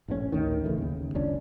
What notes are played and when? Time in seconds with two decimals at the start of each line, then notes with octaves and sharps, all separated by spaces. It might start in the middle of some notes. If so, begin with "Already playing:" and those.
0.08 A#1 A2 E3 C#4
0.32 A1 D2 D#3
0.64 C#3 E3 F3 A3
0.78 D#2 C#3
1.15 F#1 C#2 C#4 D4